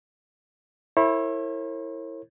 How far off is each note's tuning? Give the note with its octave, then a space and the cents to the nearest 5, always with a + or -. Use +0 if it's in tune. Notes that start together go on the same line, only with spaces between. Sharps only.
E4 +0 A#4 -45 C#5 -45